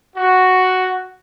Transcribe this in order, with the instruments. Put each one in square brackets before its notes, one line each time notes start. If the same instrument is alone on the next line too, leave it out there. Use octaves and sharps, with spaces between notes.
[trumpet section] F#4